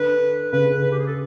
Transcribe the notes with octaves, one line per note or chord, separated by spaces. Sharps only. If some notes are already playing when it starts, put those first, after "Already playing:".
Already playing: D3 B4
C#3 B4
B4
G4
G#4
A4